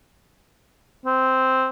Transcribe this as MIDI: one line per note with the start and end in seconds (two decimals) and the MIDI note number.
1.06 1.69 60